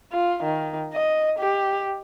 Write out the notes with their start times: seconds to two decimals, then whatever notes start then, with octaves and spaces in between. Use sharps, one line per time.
0.12 F4
0.43 D#3
0.93 D#5
1.39 G4